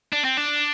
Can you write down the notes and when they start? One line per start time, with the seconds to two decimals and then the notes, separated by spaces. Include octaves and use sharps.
0.13 D4
0.25 C4
0.37 D4